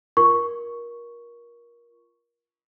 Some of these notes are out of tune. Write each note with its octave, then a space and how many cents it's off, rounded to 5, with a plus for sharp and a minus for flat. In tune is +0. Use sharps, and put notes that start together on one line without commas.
F4 -20 A#4 +25 C#6 +0